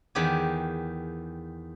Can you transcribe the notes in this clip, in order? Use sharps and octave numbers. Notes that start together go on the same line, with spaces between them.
E2 D#3 G4 G#4